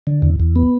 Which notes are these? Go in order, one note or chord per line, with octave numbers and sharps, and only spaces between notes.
D3
E2
E2
B3